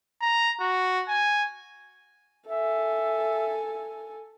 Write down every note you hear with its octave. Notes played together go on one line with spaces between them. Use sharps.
A#5
F#4
G#5
A4 E5 G#5